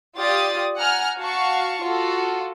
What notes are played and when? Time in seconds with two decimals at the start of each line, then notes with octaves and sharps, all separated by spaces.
0.17 F4 G4 D5 D#6 A6
0.77 F#5 G#5 A#5 F6
1.18 F#4 F5 A5 C#6
1.83 F4 F#4 A4